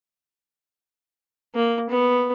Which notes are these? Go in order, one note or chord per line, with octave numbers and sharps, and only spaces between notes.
A#3
B3